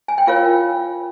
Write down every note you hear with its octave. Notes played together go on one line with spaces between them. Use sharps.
G#5
G5
F4 A#4 C#5 F5